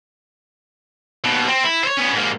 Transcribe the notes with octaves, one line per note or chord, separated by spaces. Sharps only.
D#2 B2
C4
E4
C5 C#5
B3 C#4
G#2 A#3